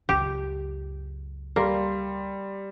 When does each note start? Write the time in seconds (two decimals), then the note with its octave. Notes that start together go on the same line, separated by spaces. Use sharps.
0.09 C#2 F#2 G4
1.56 G3 A#3 C6